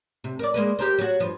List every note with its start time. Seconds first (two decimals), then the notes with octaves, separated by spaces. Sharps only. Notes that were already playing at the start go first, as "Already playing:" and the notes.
0.24 C3
0.39 A#4 D5
0.54 G#3 A#3 B4
0.79 G4 A#4 C5
0.98 F#3 F#4
1.20 G2 F3